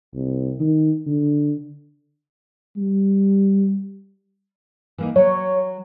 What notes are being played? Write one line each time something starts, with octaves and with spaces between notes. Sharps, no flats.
C2
D#3
D3
G3
E3 A#3 D#4
F#3 C#5